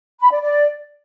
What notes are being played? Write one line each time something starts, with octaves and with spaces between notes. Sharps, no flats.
B5
D5
D5